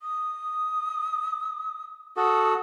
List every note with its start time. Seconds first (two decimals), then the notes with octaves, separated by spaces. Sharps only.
0.01 D#6
2.17 F#4 A4 D#6